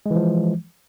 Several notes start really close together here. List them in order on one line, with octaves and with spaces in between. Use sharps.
G#3 E3 F3